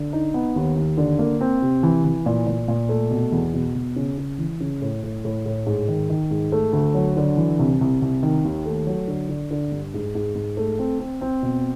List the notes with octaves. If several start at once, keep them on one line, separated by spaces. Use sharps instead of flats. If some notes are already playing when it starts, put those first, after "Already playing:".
Already playing: D3
D#4
B3
D#2
D#2
D3
A#3
C4
C3
E3
E3
A#2
A#2
A#2
A3
B2
E2
B2
B2
C#3
C#3
E3
C#3
A2
A2
A2
A2
G#2
D#3
D#3
G#2
A3
D2
F#3
D3
E3
C2
C2
C2
D#3
D#2
A3
F#3
D3
D3
D3
G2
G#2
G#2
G#2
A3
C4
C4
C4
B2